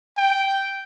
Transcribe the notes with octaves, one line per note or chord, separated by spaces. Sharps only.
G5